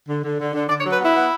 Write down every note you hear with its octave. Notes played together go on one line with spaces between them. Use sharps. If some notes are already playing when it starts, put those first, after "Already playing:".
D3
D3
D3
D3
D3 D5
C#5
F#3
B4
B3 E4
B3